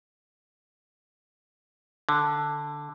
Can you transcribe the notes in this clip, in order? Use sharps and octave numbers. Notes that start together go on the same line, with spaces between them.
D3